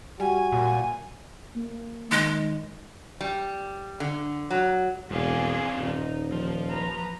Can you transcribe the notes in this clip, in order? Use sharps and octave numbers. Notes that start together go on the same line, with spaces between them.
G3 F#4 G#5
A#2
A#3
D#3 G#3
G3
D3
F#3
E1 G2 C4 G#4 D5 F5
D#1 D#4
F3
B4 A#5